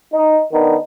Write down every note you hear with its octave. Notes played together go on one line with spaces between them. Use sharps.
D#4
D#3 B3 D4 D#4